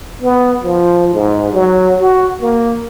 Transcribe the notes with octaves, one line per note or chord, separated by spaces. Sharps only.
B3
F3
G#2
F#3
F#4
A#3